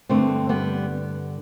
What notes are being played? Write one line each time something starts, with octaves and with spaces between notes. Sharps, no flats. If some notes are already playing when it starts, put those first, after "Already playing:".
G2 D3 A3 C4
G3 B3